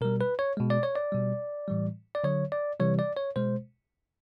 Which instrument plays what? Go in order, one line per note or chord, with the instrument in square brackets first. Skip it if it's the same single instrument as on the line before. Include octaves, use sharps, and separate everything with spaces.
[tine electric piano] B2 G3 A#4
B4
C#5
B2 G#3
D5
C#5
D5
B2 G3
A2 E3 G3
D5
D3 F#3 C#5
D5
C3 E3 G3 C#5
D5
C#5
B2 G#3 C5